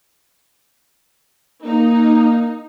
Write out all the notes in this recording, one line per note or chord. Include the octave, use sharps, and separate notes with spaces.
A#3 D#4